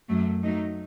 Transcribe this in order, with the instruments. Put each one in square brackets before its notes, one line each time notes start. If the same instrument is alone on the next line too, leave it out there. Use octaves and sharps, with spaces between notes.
[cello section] F#2 F#3 A3
F#3 A3 D#4